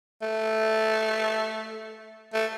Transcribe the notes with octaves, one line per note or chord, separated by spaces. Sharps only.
A3
A3